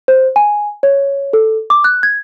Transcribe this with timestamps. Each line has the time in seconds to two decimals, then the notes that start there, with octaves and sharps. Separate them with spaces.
0.08 C5
0.36 G#5
0.83 C#5
1.33 A4
1.70 D6
1.84 F#6
2.03 G#6